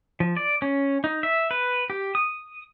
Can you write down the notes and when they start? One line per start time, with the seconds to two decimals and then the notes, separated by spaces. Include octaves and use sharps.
0.20 F3
0.37 D5
0.62 C#4
1.04 D#4
1.23 E5
1.51 B4
1.90 G4
2.15 D#6